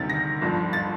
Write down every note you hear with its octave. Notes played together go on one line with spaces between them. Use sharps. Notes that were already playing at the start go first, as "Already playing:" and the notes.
Already playing: D2 C3 D#3 G3 A6
A#6
G1 G2 F3
A6